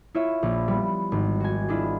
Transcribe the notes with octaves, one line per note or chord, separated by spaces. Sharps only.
E4 F4 C#5 E5
A#1
G3 B3
G#1
F#4 G#5
G#3 D4 E4 F4